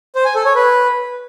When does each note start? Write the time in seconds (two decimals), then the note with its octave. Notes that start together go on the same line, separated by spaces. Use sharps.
0.15 C5
0.25 G#5
0.35 A4
0.45 C#5
0.55 B4